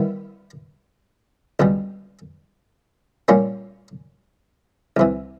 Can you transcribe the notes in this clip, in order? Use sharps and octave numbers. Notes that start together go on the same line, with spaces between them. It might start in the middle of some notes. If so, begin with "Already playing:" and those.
Already playing: D#3 G3 B3 E4
C#2 B2 G3
A#2 G3 A#3 C#4
C2 C3 E3